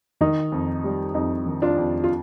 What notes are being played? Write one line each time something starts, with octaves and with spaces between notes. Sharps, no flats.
D#3 D#4
F2
G3
F2 D#4
D#3
D4 F4
F2
F4